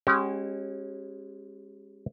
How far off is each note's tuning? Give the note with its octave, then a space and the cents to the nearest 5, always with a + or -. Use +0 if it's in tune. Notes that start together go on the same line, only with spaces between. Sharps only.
G#3 -15 C#4 -25 G4 -45